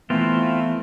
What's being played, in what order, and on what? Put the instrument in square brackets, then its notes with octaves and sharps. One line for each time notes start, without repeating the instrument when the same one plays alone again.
[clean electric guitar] E3 B3 [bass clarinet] A3 [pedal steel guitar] C4 E4 F4